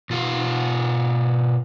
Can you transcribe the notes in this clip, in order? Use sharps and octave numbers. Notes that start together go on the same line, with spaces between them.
B2 F4 F5 F#5